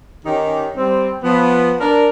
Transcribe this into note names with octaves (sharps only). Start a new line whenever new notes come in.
D#3 C#4 D#4 G4
G3 C4
F3 B3
D4 A#4